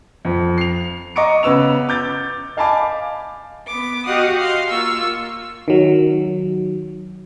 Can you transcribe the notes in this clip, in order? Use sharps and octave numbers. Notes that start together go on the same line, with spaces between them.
F2
C7 F7
D#5 A#5 C#6 D6 C#7 D7
C#3 B3 B4 E6 F7
D6 G6 A6
D#5 F5 G#5 A5 B5 D6
B3 D6
F#4 G4 D#5 F5 F#5 D#6
F5 C6
A#3 F4 C#6 E6
D#3 F#3